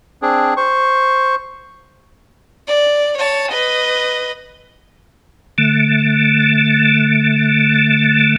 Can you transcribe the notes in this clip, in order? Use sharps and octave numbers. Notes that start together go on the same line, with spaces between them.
C4 D4 G#4
C5 C#6
D5
C#5 A5
B4 D#5
D3 A3